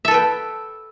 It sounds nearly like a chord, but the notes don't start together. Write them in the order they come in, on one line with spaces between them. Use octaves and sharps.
E5 A4 B4 G5